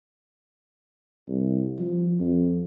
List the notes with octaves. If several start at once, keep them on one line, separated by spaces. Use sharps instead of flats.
C2
F3
F2